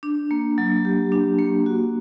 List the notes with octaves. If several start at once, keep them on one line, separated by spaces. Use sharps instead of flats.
D4
A#3
F#3
G4
D4
A#3
F#4